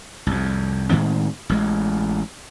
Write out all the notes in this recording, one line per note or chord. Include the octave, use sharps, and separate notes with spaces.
C2 F2
A2 D#3 G#3 C4
A1 G#3